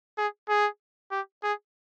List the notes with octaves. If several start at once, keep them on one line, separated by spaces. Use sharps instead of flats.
G#4
G#4
G4
G#4